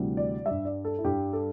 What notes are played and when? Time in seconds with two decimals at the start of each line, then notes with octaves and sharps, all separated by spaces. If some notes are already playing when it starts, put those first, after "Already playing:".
Already playing: D2 C3 E3 G3
0.17 D5
0.46 G3 E5
0.51 G2
0.65 D5
0.85 A4
0.99 E4
1.04 G2 G3 G4
1.33 A4